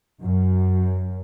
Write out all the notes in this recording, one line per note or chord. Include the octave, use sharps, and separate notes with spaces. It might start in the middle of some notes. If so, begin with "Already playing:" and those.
F#2